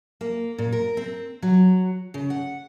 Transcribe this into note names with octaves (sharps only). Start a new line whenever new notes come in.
A#3
A#2
A#4
C4
F#3
C#3
F#5